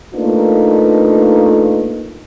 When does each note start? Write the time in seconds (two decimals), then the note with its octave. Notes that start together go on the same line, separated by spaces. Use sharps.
0.14 A3 A#3 D4 D#4 F4 B4